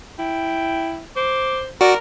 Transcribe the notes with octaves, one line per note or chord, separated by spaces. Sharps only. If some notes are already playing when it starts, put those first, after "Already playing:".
E4 G5
C5 D6
F#4 A#4 D5